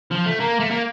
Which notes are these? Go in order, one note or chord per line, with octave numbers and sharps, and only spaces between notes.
F3
A3
A#3
A3
A#3